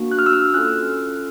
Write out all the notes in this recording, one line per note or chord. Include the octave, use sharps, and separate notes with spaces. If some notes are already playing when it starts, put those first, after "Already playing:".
Already playing: A#3 D4 F#4
F#6
F6
E6
F6
C#4 F4 A4 F#6